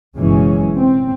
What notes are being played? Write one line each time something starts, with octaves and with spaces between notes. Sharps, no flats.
F#1 F#2 B2 E3 G#3 C#4
C4